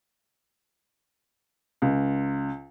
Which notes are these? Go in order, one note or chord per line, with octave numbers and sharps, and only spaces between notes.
C#2